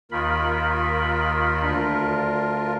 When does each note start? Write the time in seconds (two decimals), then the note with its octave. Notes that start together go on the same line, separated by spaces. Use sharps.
0.11 D#2 D#3 F4 A#4 B5
1.62 D2 D4